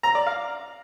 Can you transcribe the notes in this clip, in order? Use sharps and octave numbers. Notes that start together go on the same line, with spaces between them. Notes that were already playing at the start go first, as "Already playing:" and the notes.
A#5
D5
F5